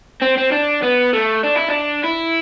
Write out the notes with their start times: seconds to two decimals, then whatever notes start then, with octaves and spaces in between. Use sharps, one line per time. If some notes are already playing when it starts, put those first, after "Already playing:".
0.22 C4
0.38 C4
0.52 D4
0.83 B3
1.13 A3
1.44 D4
1.56 E4
1.69 D4
2.04 E4